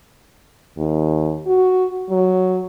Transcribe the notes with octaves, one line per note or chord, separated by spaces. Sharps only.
D#2
F#4
F#3